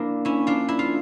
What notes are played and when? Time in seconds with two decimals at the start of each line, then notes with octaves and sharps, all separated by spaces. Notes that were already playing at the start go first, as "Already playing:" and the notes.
Already playing: A#3 D4 E4
0.25 C#4 E4
0.47 D4 F4
0.69 E4
0.79 F4